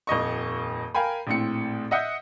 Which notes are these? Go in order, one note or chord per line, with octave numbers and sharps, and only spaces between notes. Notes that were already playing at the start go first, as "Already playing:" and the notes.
D#1 F2 D#5 C#6
A#4 F5 G5 G#5 B5
A#1 A2 C4 C#7
D#5 E5 F#5 D#6 G6